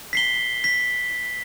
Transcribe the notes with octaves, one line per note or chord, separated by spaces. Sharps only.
B6 C7 G7
B6